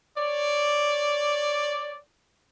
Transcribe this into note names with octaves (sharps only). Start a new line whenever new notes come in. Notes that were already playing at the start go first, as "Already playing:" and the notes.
C#5 D5